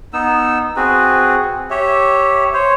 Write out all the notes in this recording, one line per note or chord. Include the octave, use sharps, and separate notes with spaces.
B3 D#4 E6
C4 F#4 G#4 B4
G4 C#5 E5
C5 C#5